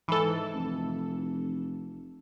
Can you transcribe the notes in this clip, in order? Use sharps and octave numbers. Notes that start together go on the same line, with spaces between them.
G#2 E3 A4
F1